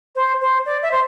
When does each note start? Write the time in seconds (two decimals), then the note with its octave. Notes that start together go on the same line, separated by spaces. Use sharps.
0.15 C5
0.41 C5
0.65 D5
0.82 E5
0.91 C5